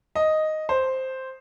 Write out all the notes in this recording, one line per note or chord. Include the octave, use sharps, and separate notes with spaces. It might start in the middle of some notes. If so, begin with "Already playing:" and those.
D#5
C5